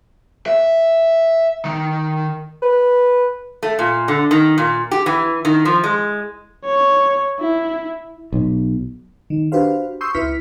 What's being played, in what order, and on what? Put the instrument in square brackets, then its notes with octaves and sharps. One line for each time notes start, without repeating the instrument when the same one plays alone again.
[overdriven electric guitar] E5
D#3
[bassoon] B4
[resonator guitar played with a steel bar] A3
A#2
D3
D#3
A#2
G4
E3
D#3
F3
G#3
[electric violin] C#5
E4
[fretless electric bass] B1
[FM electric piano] D#3
D4 F#4 G4 B4 C5 F5
C6 C#6 D#6 E6 G6 C7
C#2 E4 B4 F6 B6 C#7